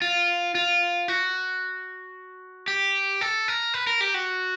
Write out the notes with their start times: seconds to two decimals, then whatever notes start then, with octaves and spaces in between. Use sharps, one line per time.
0.02 F4
0.55 F4
1.08 F#4
2.68 G4
3.21 A4
3.48 A#4
3.74 B4
3.87 A#4
4.01 G4
4.14 F#4